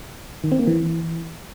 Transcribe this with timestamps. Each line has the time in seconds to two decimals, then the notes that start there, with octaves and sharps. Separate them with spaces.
0.44 D#3
0.52 C4
0.59 A#3
0.67 E3